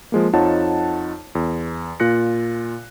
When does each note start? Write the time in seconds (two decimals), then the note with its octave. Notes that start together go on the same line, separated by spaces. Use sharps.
0.12 F3 G#3 A#3
0.33 F2 D#4 F4 C#5 F#5 A5
1.35 E2
2.00 A#2 F4 F#6 A#6 C#7